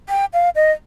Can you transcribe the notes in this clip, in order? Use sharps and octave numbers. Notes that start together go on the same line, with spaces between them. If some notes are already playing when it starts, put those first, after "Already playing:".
G5
F5
D#5